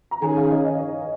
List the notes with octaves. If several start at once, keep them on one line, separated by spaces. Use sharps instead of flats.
A#5
D#3 C#4 G#4 G#5
F5
D#5
D#5
C#5